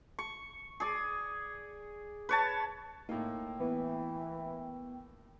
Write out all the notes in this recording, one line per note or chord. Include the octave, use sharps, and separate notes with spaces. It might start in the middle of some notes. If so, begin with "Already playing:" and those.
C#6
G#4 D5
B4 C#5 A5
A2 A#3 D#4 G5
E3 B3